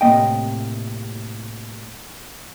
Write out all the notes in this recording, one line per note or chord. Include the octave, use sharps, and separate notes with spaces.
A2 C3 A#3 D#5 G5